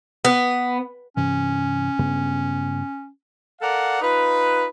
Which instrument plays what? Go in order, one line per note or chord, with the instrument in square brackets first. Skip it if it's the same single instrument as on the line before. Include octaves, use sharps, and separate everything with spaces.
[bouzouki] B3
[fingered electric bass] G2 C3 E3 [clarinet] C#4
[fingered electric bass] G2 C#3 B3
[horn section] A4 A#4 D5 F5 F#5
D#4 F4 B4